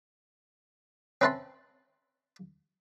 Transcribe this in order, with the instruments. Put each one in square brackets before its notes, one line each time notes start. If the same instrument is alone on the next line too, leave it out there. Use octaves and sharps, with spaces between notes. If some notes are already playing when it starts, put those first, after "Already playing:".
[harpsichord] C4 C#4 B4 E5 A5 C6